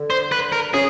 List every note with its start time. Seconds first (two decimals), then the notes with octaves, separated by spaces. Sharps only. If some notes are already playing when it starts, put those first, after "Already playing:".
Already playing: D3
0.10 C5
0.32 B4
0.52 A#4
0.74 C#4 G#4